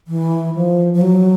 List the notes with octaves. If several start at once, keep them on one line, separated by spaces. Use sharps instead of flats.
E3
F3
F3
F#3